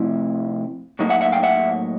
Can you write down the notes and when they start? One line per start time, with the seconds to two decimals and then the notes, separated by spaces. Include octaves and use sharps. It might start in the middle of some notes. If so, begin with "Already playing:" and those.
Already playing: C3 F3 A3 C4 E4
0.99 A2 F#3 A#3 D#4
1.09 E5 F#5
1.21 E5 F#5
1.32 F5 G5
1.43 E5 F#5